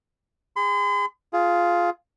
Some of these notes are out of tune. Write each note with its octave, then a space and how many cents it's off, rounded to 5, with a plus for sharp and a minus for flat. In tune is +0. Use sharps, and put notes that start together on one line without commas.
G#4 -35 C6 -45
F4 +0 G#4 +20